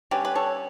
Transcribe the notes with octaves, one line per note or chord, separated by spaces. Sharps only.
D3 G3 C#4 G4 B4
B4
A4 C#5